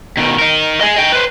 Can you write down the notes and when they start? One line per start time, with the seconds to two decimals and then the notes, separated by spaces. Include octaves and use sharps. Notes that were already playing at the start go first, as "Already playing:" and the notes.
0.17 B2 D#3
0.39 D#4 A#4
0.81 G#4 D#5
0.96 D#5 G5
1.12 B4 C5